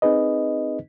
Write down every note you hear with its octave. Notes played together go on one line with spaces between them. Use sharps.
C4 D#4 G#4 B4 D#5